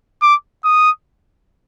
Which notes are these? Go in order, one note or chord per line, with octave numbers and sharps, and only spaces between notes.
D6
D#6